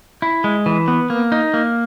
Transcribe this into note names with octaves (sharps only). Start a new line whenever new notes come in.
E4
G#3
E3
B3
A#3
D#4
A#3